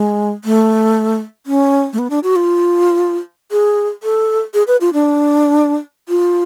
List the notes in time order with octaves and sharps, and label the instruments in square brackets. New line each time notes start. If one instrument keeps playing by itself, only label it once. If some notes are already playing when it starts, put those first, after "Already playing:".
Already playing: [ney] G#3
A3
C#4
A3
B3
D4
F#4
F4
G#4
A4
G#4
B4
F4
D4
F4